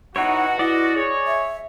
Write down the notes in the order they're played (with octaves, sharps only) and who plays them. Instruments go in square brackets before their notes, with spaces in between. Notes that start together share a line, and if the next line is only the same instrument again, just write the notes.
[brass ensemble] B2 F#4 [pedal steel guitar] D#4 E4 C#5 [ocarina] F#5
[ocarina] E4 [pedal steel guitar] D5 D#5
[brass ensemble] G#4 C#5
[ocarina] E5